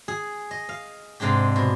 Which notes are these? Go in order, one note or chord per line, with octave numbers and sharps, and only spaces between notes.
G#4
D#5
F5
G#2 C3 G#3 D4 G4
B2